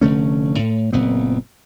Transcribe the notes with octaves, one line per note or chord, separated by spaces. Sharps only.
F1 D3 A3 C#4
A2
F#1 A#2 B3 C4